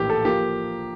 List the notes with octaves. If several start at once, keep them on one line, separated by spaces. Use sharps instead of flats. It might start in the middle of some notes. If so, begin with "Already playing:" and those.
Already playing: A#1 A2 E3 A#3 G4
A4
F3 A#3 G4